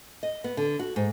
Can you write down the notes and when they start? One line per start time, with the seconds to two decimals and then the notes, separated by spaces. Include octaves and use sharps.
0.23 D#5
0.44 B3
0.57 D3
0.79 F#4
0.96 G#2